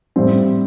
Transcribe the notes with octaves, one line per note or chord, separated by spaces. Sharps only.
A2 G3 C4